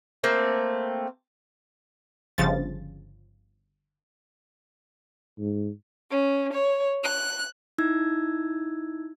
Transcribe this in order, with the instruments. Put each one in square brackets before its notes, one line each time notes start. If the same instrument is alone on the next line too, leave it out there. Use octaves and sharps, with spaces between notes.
[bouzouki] A3 A#3 C4
[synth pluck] G1 C#3 F3 A6
[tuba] G#2
[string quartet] C#4
C#5
F#6
[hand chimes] D#4 E4 E6 G#6